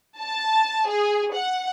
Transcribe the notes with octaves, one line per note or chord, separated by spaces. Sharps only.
A5
G#4
F#5